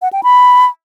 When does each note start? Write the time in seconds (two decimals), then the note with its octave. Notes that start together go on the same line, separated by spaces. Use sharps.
0.02 F#5
0.13 G5
0.23 B5